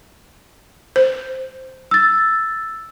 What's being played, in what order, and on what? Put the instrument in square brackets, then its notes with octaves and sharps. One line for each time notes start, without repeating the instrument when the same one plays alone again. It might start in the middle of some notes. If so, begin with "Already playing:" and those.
[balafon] C5
[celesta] E6 A6